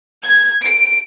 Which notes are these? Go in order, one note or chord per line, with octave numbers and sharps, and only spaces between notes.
G#6
D7